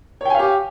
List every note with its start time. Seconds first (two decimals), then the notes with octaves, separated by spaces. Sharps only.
0.21 C#5
0.25 G5
0.30 G#5
0.35 F5
0.39 G4